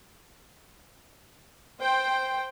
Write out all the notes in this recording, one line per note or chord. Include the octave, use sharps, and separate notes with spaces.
C5 G5